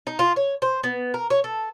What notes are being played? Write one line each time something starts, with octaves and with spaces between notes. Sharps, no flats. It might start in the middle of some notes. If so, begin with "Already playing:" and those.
D#4
F4
C#5
C5
B3
A#4
C#5
A4